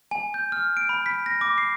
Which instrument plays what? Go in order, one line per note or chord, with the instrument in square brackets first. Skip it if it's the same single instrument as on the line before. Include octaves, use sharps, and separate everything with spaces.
[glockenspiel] G#5
G6
F6
D7
B5
B6
A#6
D6
C7